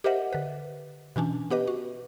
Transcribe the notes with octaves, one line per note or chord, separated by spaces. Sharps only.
G4 A#4 C5 D#5 E5 F#5
D3 B4
B2 E3 C#4 D4
B3 G4 B4 D#5
F#4